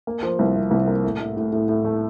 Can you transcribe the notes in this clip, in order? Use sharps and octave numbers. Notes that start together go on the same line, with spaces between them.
A#3
F3
C2
C3
C2
A#3
A2
A2
A2
A2
A2
A3